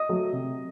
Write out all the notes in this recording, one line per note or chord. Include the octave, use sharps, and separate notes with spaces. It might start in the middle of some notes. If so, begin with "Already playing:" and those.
Already playing: D#5 D#6
F#3 A3
C3